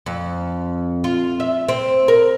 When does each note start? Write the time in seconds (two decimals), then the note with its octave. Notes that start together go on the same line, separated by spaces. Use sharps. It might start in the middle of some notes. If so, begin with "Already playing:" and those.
0.06 F2
1.04 F4
1.40 E5
1.69 C4
2.08 A#4